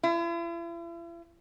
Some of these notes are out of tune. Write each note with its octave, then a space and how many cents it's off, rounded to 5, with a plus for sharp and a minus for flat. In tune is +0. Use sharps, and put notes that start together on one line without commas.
E4 +45